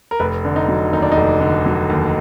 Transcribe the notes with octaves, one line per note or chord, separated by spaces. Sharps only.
A#4
F1 B4
D3
D#4
F#3
D#2 D#4
D4
D#4
F1
D3
F#3
D#2